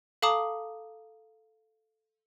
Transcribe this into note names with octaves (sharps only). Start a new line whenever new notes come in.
A4 F5 A5 A#5 D6 D#6